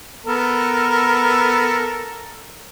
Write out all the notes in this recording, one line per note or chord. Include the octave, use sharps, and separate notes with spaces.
B3 A4 A#4